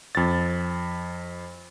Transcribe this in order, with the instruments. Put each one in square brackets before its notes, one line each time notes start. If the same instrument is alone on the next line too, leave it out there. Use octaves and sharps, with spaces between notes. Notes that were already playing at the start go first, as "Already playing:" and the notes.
[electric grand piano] F2 A6